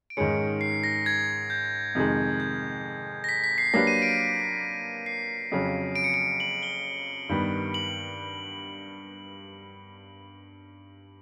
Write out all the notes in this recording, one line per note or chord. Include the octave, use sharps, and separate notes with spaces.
D7
G#2 D#3 G#3 C#4 C#7
C7
A#6
G#6
G6
F2 C3 D#3 G#3
G6
A#6
B6
B6
C7
F#3 A#3 D4 G4 B4 A#6
D#7
D7
C7
F2 C#3 F#3
D7
C#7
D7
F#7
G7
G2 D#3 G3 B3
F#7